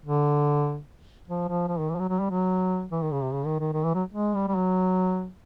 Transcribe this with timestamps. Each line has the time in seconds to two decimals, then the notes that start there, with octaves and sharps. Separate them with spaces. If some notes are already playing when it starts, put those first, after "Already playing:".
0.05 D3
1.28 F3
1.48 F3
1.68 F3
1.79 D#3
1.89 E3
1.95 F3
1.99 F#3
2.09 F#3
2.19 G3
2.30 F#3
2.91 E3
3.02 D#3
3.12 C#3
3.22 C3
3.33 C#3
3.46 D#3
3.59 D#3
3.73 D#3
3.83 E3
3.94 F#3
4.13 G#3
4.34 G3
4.48 G3
4.55 F#3